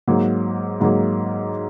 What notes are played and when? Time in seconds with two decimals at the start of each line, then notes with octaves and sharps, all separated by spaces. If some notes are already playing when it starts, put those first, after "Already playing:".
0.08 G#2 F#3 A#3
0.81 G#2 F#3 A#3